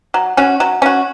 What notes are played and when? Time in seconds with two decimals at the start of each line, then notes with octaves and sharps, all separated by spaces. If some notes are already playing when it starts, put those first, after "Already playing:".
0.14 F#3
0.37 C#4 F#4
0.60 F#3
0.82 C#4 F#4